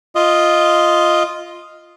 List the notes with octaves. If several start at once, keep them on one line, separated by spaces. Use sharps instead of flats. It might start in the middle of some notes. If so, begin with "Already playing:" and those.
F4 D#5